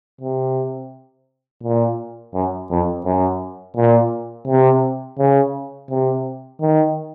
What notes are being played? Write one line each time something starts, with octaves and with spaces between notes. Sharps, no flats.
C3
A#2
F#2
F2
F#2
A#2
C3
C#3
C3
D#3